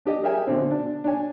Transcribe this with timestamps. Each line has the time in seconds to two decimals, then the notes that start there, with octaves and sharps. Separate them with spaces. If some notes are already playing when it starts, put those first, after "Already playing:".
0.05 D4 G4 D#5
0.23 G#4 A#4 C#5 E5 G5 G#5
0.47 B2 D3 C4
0.71 D4
1.04 D4 C#5 G#5